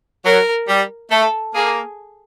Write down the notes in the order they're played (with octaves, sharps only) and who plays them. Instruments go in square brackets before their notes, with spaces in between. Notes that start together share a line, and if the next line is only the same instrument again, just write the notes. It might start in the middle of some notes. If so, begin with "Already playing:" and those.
[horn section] F#3 [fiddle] A#4
[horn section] G3
[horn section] A3 [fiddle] A4
[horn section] A#3 [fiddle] G#4